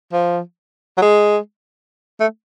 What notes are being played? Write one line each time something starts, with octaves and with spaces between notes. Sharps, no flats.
F3
F#3
G#3
A3